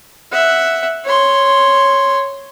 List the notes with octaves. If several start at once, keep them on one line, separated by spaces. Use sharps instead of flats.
E5 F#5
C#5 C6